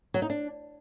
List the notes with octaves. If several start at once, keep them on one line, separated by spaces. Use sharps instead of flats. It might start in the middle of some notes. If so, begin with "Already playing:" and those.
F#3
D#4
D4